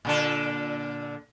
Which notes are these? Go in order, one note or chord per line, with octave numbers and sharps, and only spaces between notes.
A#2 D3 A4